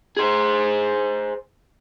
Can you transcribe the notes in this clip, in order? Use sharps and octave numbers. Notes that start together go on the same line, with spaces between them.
G#4 C5